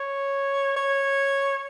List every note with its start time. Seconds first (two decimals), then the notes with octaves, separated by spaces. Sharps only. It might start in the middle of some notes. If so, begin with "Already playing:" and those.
Already playing: C#5
0.76 C#5